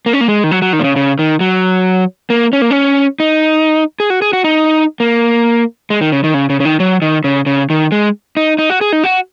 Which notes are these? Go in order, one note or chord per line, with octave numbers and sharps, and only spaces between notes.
A#3
C#4
A#3
G#3
D#3
F#3
F#3
D#3
A#2
C#3
C#3
D#3
F#3
A#3
C#4
A#3
C#4
D#4
G#4
F#4
G#4
F#4
D#4
A#3
G#3
D#3
C#3
D#3
C#3
C#3
C#3
D#3
F#3
D#3
C#3
C#3
D#3
G#3
D#4
D#4
F#4
G#4
D#4
F#4